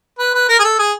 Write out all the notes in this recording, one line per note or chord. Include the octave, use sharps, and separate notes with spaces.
B4
B4
A#4
G#4
A4
G#4